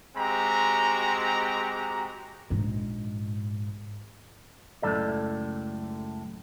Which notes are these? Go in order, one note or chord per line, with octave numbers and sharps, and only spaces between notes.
G#3 C4 F#4 G4 A#5
A#1 G#2
C#2 F#2 A2 D#3 A4 D5